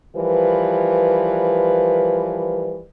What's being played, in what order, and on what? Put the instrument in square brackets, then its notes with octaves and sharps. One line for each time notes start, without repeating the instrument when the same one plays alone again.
[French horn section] E3 F3 G3 A#4 B4